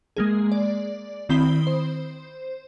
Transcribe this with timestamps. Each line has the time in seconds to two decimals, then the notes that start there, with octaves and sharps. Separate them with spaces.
0.17 G#3 A#3 G#4
0.52 D5
1.29 D#3 C4 E4 B5 D#6 G7
1.67 C5